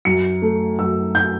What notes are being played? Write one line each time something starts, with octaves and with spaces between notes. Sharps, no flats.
F#2 C#7
A3
F#2 E6
G6